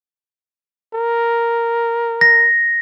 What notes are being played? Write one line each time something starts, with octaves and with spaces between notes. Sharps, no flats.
A#4
A#6